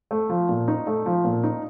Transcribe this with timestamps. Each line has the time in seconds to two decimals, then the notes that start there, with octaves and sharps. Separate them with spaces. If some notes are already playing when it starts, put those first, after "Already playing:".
0.11 A3
0.30 F3
0.49 A#2
0.68 D#4
0.87 A3
1.06 F3
1.25 A#2
1.44 D#4